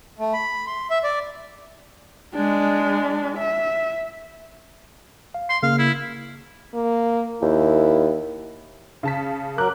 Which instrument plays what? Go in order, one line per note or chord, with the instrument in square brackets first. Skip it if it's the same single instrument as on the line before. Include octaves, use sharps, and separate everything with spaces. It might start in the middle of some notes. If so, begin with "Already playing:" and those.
[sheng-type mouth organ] A3
B5
C6
E5
D5
[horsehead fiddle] G#3 D4
E5
[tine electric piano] F5
[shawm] C6
[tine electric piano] C#3 A#3 [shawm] F5
[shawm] E4
[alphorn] A#3
[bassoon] D#2 [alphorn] E4
[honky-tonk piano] C#3 A5 B6
[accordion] F#3 A#4 [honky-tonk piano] D6 F#6